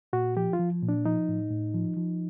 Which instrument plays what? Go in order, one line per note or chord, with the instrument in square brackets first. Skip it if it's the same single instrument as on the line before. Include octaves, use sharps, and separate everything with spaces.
[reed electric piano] A#2 F#4
F3 G4
F4
F3
A#2
D4
F3 D#4
A2
A2
F3
F3